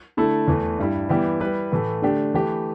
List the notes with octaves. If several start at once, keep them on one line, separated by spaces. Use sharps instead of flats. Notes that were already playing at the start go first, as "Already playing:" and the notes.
D3 A3 E4 A4
E2 E3 A3
G2 G3 E4
E3 G3 B3 E4 G4
G3 E4 B4
A2 E3 A3
D3 A3 D4 G4
E3 A3 G4 B4